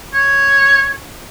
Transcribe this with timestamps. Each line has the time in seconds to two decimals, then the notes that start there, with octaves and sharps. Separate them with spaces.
0.14 C#5